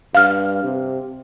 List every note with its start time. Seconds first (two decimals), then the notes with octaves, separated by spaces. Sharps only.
0.15 G2 F5 F6
0.64 C3